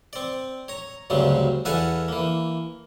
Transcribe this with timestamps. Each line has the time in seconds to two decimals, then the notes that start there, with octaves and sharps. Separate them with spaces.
0.13 C4 D5
0.68 C#5 A#5
1.10 D2 G2 C#3 F#3 C4
1.65 E2 A4 B4 F5 F#5 G#5
2.08 E3 A#3